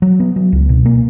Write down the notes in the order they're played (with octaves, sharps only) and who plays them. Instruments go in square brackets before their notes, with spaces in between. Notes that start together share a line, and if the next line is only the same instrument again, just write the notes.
[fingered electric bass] F#3
B3
F#3
C#2
B2
A#3